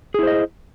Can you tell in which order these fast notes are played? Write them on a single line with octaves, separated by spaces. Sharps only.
G#4 E4 C5 D#5